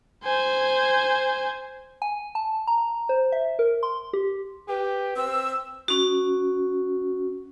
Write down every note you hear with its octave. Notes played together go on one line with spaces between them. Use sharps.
C5 G#5
G#5
A5
A#5
C5
E5
A#4
C6
G4
G4 B4
C4 E6
C#4 F#4